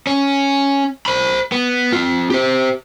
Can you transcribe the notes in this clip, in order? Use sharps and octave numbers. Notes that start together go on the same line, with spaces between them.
C#4
C5 B5
B3
C4 F4
G4 C5